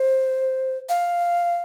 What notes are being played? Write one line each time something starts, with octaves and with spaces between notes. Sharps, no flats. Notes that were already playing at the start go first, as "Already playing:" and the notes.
Already playing: C5
F5